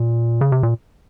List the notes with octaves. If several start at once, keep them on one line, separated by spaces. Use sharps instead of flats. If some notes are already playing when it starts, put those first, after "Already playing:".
Already playing: A#2
C#3
C3
A#2